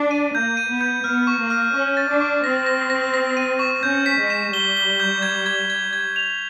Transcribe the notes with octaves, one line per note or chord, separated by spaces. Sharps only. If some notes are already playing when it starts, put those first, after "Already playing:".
Already playing: D4
D#7
A#3 G6
D#7
B3
G6
B3 F6
C#6
A#3
F6
C#4 C#6
A6
D4
C#6
C4 A#6
A#6
A#6
A#6
D#7
C#6
C#4 G6
B6
G#3
E7
G3 G7
G7
G6
G#6
G#6
G#6
G#6
F7